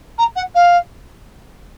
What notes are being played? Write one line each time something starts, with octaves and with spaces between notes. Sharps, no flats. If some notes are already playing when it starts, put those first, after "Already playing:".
A#5
F#5
F5